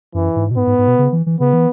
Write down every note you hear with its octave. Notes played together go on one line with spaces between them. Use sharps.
F#2 E3
G#2
B2
G#2 B3
G#2
G#2
B2
C#3
E3
E3
C#3 B3
E3